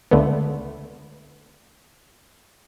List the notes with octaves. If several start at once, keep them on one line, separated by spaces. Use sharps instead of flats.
C#2 D3 A3 B3